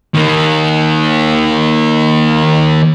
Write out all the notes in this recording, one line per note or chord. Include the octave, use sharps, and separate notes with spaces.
D#3 A#3